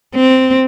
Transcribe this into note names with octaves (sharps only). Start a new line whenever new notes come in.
C4